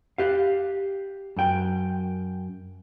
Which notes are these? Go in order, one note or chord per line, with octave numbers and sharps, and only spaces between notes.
G4 F5
F#2 G5